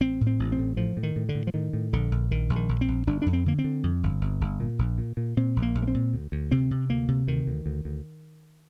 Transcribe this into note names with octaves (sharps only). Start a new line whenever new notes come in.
A1 C4
A2
C4
A1
C4
A2
A2 F3
A2
D#3
A2
D3
A2
F3
A2 D#3
A2
A#1 D3
A#1
A#1 D#3
A#1
D#3
A#1
C4
A#1
G1 D4
F2 D4
C4
D3 A#3
C4
D3
F2
G1
G1
G1
A#2
A#1
A#2
A#2
A#2 C4
A#1
A#3
A#1
A#3
C4
A#2
D2
D2
C3 C4
C3
D2 A#3
C3
D2 D#3
D2
D2
D2